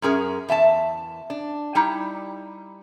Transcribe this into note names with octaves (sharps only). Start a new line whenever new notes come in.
F#2 C#4 G#4 A#4
E2 E5 G#5 A5
D4
G3 D#4 E4 G4